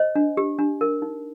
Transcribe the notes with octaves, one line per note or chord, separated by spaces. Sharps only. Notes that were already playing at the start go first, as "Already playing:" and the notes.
Already playing: C5 D#5
D4
G4
D4
A#4
D#4